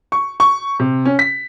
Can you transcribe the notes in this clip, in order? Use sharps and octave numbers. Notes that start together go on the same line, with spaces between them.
C#6
C#6
C3
C#4
B6